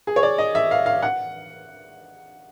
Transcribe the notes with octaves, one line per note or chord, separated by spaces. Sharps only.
G#4
C#5
D5
D#5
E5
F5
F5
F#5